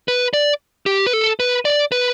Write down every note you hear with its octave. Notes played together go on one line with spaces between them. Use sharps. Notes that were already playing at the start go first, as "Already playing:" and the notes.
B4
D5
G4
B4
A4
B4
D5
B4